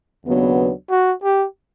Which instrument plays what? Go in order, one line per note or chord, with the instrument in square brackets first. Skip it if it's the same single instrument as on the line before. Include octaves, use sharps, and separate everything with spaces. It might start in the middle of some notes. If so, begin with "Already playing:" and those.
[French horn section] D#2 C#3 F#3 B3 D4
[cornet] F#4
G4